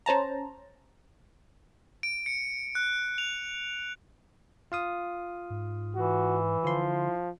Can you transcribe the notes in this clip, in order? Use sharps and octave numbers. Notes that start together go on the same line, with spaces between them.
C#4 C5 A5 A#5
D7
C#7
F#6
F7
F4 F5 D#6
G#2
E3 F#4
D3 F3 E4 C6